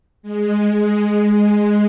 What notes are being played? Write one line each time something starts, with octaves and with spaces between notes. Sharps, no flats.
G#3
G#3